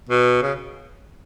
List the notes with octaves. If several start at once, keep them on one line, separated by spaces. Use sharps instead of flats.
B2
C#3